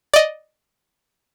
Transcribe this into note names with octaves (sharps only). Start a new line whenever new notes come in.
D5 D#5